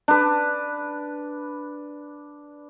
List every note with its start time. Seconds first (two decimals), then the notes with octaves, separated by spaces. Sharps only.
0.08 D4 B4